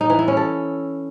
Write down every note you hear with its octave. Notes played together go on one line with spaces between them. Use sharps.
D#4
E3
E4
C#4
A4